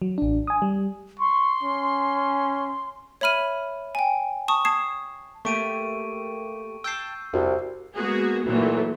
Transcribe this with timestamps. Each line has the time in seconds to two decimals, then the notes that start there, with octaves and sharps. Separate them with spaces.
0.02 F#3
0.18 A1 D4
0.47 G#5 D#6
0.62 G3
1.19 C6 C#6
1.63 C#4
3.21 C#5 E5 B5 F6 D#7
3.95 G5 G#5
4.48 A5 C#6 D#6
4.65 A5 D#6 G#6 C7 E7
5.45 A3 A#3 G4 C#6 D7 D#7
6.84 G5 A5 E6 G6 C7
7.33 C2 F2 F#4
7.95 G#3 A#3 B3 F#4 G#4
8.45 B1 A#2 E3 F#3 A3